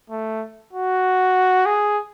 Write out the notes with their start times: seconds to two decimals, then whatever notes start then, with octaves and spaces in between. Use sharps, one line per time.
0.10 A3
0.73 F#4
1.66 G#4